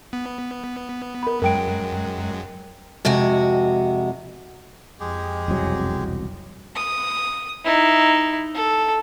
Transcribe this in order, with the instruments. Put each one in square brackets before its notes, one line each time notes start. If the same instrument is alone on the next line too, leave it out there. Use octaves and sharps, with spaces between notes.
[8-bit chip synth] B3
[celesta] A#4 B5
[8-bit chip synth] F#2 F#3 G#3 [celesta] A#4 G5 D7
[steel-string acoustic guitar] F2 C3 G#3 F#4
[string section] F2 [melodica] G#3 G4 G#4
[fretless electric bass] E1 C2 F#3
[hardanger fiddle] D#6
D#4 E4
A4